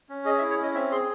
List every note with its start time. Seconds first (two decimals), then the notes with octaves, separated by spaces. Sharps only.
0.09 C#4
0.25 G#4 D#5
0.38 E5
0.41 E4
0.50 C#5
0.58 C#4 D#5
0.75 C4 E5
0.91 G#4 C6